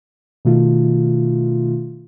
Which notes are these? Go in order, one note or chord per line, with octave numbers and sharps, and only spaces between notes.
B2 D#3 A3 F4